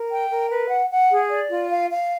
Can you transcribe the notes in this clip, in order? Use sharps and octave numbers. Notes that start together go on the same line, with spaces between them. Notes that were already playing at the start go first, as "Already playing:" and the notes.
Already playing: A#4
G5
A#4
B4
F#5
F#5
G#4
D5
F4
F5
F5